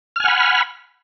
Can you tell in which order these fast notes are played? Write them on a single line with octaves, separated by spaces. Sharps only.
F6 G#5 F#5 B5